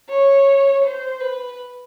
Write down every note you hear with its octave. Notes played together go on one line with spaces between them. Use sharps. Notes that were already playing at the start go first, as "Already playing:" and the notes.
C#5
C5
B4